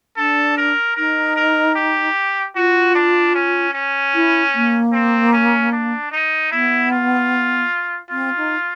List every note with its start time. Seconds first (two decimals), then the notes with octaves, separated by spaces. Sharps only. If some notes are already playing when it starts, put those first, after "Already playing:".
0.16 D4 A4
0.57 A#4
0.96 D#4 A#4
1.36 A#4
1.75 G4
2.55 F4 F#4
2.95 D4
3.34 C#4
3.74 C#4
4.14 E4
4.54 A#3
4.92 C4
5.32 C#4
5.72 D4
6.12 D#4
6.51 B3 E4
6.91 F4
8.10 C4 F4
8.36 D#4